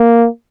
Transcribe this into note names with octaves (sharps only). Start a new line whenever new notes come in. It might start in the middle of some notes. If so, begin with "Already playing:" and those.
Already playing: A#3